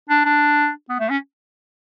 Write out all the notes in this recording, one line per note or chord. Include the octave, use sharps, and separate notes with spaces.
D4
D4
B3
A3
C#4